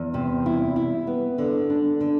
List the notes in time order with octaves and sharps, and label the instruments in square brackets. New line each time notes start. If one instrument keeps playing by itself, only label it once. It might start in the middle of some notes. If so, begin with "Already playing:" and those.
Already playing: [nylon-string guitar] E2
C3
E4
E4
B3
D3
D4
D3